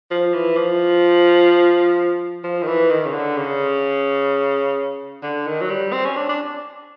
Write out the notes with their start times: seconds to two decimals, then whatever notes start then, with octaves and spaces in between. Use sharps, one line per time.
0.11 F3
0.34 E3
0.57 F3
2.44 F3
2.63 D#3
2.67 E3
2.90 D#3
3.06 C#3
3.13 D3
3.37 C#3
5.23 D3
5.47 D#3
5.61 F#3
5.70 G3
5.93 C4
6.05 C#4
6.16 D4
6.29 D4